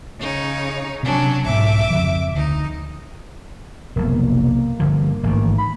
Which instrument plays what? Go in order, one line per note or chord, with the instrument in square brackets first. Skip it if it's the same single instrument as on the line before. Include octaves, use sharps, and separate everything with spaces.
[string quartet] C#3 D#4 C#5
[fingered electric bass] C3 [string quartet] F#3 C#4 D4
[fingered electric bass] B1 G#2 [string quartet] E5 D6
[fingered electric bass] F2 C#3 F3
[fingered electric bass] D2 [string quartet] D#4
[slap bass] F1 B1 [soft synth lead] A#3
[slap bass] G1 D3 F3
A1 G#2 D#3
[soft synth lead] B5